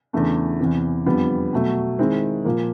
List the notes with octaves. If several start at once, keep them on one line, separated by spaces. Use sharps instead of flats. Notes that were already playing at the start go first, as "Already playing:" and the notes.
E2 C#3 E3 A3 D4
E2 C3 E3
F2 D3 G3 B3
B2 F#3 A3
D#3 G#3 C4 E4
A#2 F3 A#3